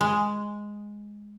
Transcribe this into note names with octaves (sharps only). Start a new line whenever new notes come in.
G#3